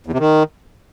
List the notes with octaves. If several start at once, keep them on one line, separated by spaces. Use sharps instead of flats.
E2
C3
D#3